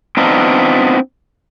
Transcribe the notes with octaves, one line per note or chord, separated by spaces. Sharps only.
B3 C4 D4 D#4 F4